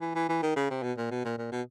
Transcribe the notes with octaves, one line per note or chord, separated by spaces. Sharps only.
E3
E3
E3
D#3
C#3
C3
B2
A#2
B2
A#2
A#2
B2